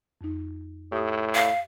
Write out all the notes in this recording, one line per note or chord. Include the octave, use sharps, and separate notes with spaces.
F2 D#4
A2 G4 D#6
F5